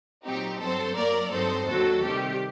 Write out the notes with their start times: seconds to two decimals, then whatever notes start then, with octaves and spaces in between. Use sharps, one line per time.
0.25 A#2 F#3 C4 D#4 G4
0.60 G2 F#3 C4 A4 C5
0.96 F#2 F#3 A#3 A#4 D5
1.31 G2 F#3 C4 D#4 A4 C5
1.67 D#2 D3 F#3 F#4 A4
2.03 C3 D#3 G3 G4